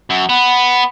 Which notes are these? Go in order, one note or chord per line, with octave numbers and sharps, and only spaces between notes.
F#2
B3